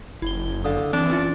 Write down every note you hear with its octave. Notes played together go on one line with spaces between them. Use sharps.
F#1 E4 G7
D3 F5 D#6
E3 C4 D4
C#4 F4 A6